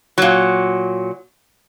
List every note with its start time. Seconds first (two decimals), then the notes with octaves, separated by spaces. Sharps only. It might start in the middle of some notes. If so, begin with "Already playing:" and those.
0.18 A#2 F#3